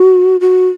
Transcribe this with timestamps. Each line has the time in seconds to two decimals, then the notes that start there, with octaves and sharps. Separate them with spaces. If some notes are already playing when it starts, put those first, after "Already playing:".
Already playing: F#4
0.41 F#4